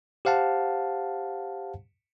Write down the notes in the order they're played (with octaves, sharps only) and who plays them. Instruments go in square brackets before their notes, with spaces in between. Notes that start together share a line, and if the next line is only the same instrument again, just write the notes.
[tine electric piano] G4 C5 F5 F#5 A5